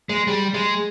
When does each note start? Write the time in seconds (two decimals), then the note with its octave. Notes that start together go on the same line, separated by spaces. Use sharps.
0.09 G#3
0.28 G3
0.54 G#3